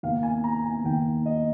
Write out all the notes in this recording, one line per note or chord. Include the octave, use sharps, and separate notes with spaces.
D#2 D#3 A#3 F5
G#5
A#5
G#5
D#2 D#3 A#3 G5
D#5